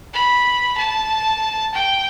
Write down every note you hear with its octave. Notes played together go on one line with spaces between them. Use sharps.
B5
A5
G5